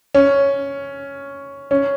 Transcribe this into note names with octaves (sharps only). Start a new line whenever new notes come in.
C#4
C#4